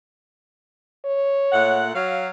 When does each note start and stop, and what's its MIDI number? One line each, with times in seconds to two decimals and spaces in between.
1.06 1.82 73
1.52 1.89 46
1.52 1.89 57
1.52 1.89 78
1.95 2.28 54
1.95 2.28 77